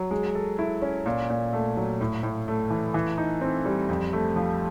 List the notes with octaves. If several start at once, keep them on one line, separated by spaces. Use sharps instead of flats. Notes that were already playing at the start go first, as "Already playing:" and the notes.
Already playing: F#3
G#3
A4
E4
C#4
A#2
A#2
A3
F#3
A2
A2
A3
E3
E3
D#4
C4
G3
F2
A3
F3